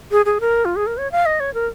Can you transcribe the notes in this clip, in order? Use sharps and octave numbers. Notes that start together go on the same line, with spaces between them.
G#4
G#4
A#4
F4
G#4
A#4
C#5
F5
D#5
C#5
A#4